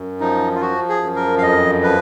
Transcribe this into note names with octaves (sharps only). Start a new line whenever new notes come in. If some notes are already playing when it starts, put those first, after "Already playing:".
Already playing: F#2
F3 D#4
F4
F3 F#4
G#4
F#2
A#4
F5
F2 D#5
F3 B4